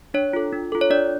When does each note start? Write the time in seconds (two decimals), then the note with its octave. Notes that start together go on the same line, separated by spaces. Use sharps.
0.14 D4 C#5
0.33 F4 A4
0.53 D4
0.72 F4 A4
0.81 C#5
0.90 D4 D5